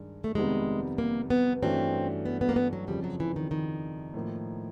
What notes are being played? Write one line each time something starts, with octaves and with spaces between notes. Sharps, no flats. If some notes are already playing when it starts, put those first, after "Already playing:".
Already playing: G2 D#3 G#3
A3
F2 C3 D#3 G3 G#3 B3
A#3
B3
G2 E3 A3 C4 C#4 F#4
B3
B3
A#3
B3
F#3
F2 C#3 F3 G3
F#3
E3
D#3
D#3
A2 F3 A#3